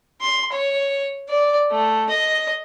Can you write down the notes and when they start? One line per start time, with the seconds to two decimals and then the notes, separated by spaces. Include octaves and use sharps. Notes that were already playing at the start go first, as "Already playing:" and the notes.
0.21 C6
0.52 C#5
1.29 D5
1.71 A3
2.09 D#5